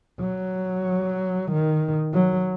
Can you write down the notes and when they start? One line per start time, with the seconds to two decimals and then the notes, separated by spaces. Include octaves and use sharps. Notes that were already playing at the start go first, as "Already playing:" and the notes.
0.20 F#3
1.52 D#3
2.14 F#3